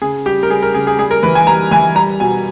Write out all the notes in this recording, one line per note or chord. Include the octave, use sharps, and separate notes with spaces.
C#3 G#4
G3 G4
A#4
G3 G#4
A#4
C#3 G#4
G#4
G3 G#4
A#4
E3 B4
G#5
G3 A#5
E3 G#5
G3 A#5
B2 G#5